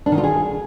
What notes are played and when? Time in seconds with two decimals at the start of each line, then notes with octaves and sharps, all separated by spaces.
0.06 D4
0.12 D#3
0.18 F4
0.24 G#4